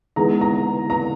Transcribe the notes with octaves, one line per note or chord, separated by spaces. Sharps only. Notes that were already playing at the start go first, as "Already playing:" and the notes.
E3 G#3 B3 D#4 A#5
A#5
A#5